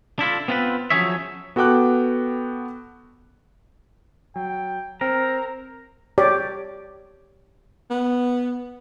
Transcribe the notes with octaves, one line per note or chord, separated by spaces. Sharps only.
D4 E4 F4 A4
B3 C4 F4 A4 B4
F3 F#3 C#4 G#4 C#5 E5
B3 F#4 A4 G5 D6 F#6
F#3 G5
C4 A#4 C5 G5 A#5
G4 C#5 D5
B3